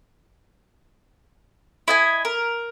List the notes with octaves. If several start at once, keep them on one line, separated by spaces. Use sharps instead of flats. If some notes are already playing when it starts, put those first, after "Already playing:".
E4 D#5 G#5
A#4